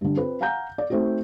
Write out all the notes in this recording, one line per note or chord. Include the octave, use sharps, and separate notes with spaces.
G2 D3
C4 F4 B4
F5 F#5 G#5 A#5 G6
D5
A3 C4 D#4 F#4